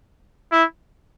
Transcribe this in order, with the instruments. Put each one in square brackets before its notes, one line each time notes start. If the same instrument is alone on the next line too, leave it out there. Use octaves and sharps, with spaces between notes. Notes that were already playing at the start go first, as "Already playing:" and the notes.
[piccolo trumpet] E4